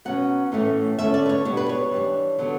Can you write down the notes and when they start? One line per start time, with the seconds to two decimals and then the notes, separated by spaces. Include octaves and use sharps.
0.05 B2 F#3 C#4 F#5
0.52 A2 E3 A3 C#4
0.98 D3 A3 C#4 E5
1.14 D5
1.26 B4
1.29 C#5
1.45 B2 G3 B3 D4 C#5
1.57 B4
1.69 C#5
1.92 E3 G3 D4
2.39 D3 F#3 B3